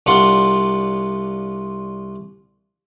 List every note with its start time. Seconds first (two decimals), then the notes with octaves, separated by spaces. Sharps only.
0.06 C2 D4 F4 F#5 C6